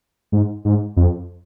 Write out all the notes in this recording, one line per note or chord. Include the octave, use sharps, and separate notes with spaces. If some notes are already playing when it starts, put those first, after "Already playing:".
G#2
G#2
F2